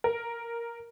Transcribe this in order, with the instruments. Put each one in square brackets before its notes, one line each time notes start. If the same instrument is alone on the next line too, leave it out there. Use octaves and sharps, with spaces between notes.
[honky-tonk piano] A#4